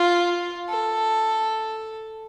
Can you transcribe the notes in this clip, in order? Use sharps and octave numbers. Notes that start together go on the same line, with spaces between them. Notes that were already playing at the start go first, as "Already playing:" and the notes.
Already playing: F4
A4